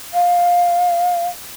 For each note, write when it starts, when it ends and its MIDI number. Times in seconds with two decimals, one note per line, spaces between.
0.14 1.27 77